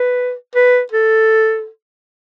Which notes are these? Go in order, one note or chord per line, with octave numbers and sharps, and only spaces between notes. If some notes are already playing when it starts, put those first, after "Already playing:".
Already playing: B4
B4
A4